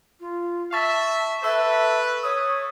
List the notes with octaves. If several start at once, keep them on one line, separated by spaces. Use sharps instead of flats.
F4
E5 A5 C#6 A6 B6
A4 B4 E5 E6
C#5 D#6